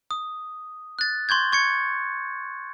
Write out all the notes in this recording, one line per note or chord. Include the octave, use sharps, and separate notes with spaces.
D#6
F#6 A6
C6 C#6 G6 G#6
C#6 G#6 C#7